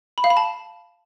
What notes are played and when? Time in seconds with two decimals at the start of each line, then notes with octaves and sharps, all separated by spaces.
0.18 B5
0.24 F5
0.30 B5
0.37 A5